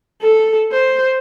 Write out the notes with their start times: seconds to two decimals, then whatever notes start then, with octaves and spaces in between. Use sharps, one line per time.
0.22 A4
0.71 C5